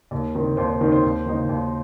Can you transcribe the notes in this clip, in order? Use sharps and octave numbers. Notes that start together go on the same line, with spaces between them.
D#2
D#3 C4 D#4
D#2 C5
C5
D#3 C4 D#4
C5
D#2
D#3 A#3 D#4
D#2